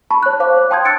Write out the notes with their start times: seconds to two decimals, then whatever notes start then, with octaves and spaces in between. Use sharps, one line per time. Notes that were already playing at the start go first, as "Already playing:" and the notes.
0.11 A5 B5 C#6
0.23 C#5 F#6
0.40 C5 F5 D6 F#6
0.57 C#5
0.71 G5 A5 C6 D#6 G6 G#6
0.85 D#6 E6 F#6 A6 C#7 D7